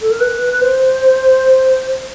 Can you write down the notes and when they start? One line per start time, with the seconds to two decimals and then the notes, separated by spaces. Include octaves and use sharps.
0.01 A4
0.11 A#4
0.20 B4
0.61 C5